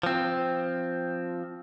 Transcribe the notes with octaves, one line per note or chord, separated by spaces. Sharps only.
F3 C4